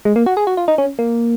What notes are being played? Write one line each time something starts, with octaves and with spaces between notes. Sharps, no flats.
G#3
A#3
F#4
G#4
F#4
F4
D#4
C#4
A#3